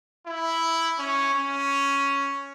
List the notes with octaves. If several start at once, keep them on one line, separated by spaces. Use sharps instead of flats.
E4
C#4
C#4